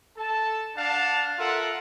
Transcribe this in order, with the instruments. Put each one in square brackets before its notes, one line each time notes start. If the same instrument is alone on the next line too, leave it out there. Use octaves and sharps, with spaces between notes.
[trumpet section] A4 A5
D4 F5 F#5 A5
F4 A4 A#4 E5 F#5